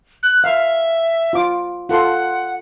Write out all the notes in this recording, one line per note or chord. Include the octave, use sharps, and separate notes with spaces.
F#6
E5 F5
F4 D6
F4 A4 F#5 C6